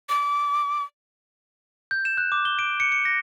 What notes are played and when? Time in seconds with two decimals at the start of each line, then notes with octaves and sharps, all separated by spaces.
0.09 D6
1.91 G6
2.05 E7
2.17 F#6
2.32 D6
2.45 G7
2.59 D7
2.80 C#7
2.92 C#7
3.05 A#6